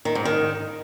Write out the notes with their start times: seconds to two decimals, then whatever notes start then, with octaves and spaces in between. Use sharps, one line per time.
0.05 D#3
0.15 G#2
0.25 D#3